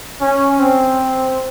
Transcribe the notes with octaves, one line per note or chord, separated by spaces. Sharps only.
C#4
C4